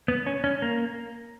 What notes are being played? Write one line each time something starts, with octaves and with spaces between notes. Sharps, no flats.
B3
C#4
C#4
A#3